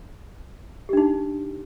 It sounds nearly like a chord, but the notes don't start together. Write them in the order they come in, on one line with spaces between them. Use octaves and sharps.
G4 D4 D#4